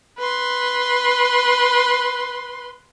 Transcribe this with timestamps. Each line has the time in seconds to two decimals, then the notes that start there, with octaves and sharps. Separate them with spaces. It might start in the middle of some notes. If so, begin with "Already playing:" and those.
0.18 B4 C6